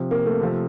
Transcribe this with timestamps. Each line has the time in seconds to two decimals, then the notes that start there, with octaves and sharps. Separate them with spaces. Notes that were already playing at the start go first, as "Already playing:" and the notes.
Already playing: C3 F3
0.11 A#3
0.26 A3
0.40 C3 F3